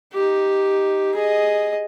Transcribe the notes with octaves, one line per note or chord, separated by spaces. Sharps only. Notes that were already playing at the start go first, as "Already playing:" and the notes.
D#4 G4
G#4 D#5